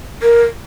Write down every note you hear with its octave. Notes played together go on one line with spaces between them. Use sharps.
A#4